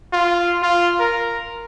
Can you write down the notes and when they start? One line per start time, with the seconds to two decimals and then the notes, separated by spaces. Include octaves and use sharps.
0.13 F4
0.62 F4
1.00 A#4